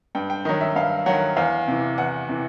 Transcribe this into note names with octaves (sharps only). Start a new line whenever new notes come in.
G2 G5
G5
D#3 F#3 D#5
E5
G2 F5
D#3 F#3 F#5
E2 F5
C3 E3
E2 F#5
C3 E3